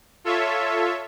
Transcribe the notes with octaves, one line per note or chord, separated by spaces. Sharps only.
F4 A4 C#5 E5